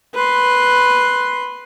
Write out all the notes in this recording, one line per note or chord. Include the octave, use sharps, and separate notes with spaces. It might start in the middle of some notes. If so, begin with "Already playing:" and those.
B4 C6